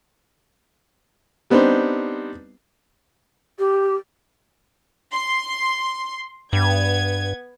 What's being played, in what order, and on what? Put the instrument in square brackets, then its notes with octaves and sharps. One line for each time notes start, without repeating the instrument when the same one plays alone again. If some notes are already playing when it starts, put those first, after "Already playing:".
[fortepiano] G3 B3 C4 D4 D#4 C5
[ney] G4
[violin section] C6
[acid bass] G2 [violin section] B3 G#6